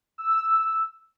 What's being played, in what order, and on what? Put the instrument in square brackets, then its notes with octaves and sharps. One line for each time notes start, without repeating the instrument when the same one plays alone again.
[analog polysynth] E6